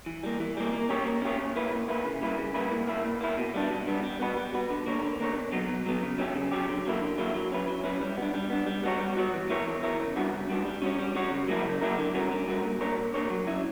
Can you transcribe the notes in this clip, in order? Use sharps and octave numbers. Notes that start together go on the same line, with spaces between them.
E3
G3 A#3
E3
G3 A#3
A#3
C#4 G4 C#5
A#3
C#4 G4 C#5
A#2
A#3 E4 B4
A#2
A#3 E4 B4
C#3
G3 A#3 E4 B4
C#3
G3 A#3 E4 B4
A#2
A#3 E4
A#2
A#3 E4
B2
G3 B3 D4
B2
G3 B3 D4
G3
B3 F#4 B4
G3
B3 F#4 B4
D3
A#3 D4 A#4 C#5
D3
A#3 D4 A#4 C#5
B2
F#3 B3
B2
F#3 B3
C#3
F#3 C#4 G4
C#3
F#3 C#4 G4
D3
F#3 A#3 E4
D3
F#3 A#3 E4
F#3
C#4 E4 B4
F#3
C#4 E4 B4
G3
B3
D4
G3
B3 D4
G3
B3 F#4 C#5
G3
B3 F#4 C#5
E3
B3 E4 A#4 C#5
E3
B3 E4 A#4 C#5
C#3
G3 B3 D4 F#4
C#3
G3 B3 D4 F#4
G3
C#4 F#4 C#5
G3
C#4 F#4 C#5
C#3
F#3 A#3 E4 A#4
C#3
F#3 A#3 E4 A#4
D3
G3 C#4 F#4 A#4
D3
G3 C#4 F#4 A#4
A#2
A#3 D4 A#4 C#5
A#2
A#3 D4 A#4 C#5
F#3
C#4 E4